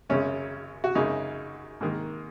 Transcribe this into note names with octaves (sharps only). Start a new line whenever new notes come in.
G#1 F#2 C#3 G#3 C#4
F#4
F#2 C#3 G#3 D#4
G#2 D#3 A#3